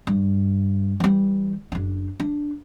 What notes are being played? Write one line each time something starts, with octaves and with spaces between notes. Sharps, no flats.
G2
E3 G3
F#1 D4
D4